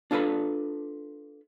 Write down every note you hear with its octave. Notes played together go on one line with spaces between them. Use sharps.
D4 F4 A4 B4 B5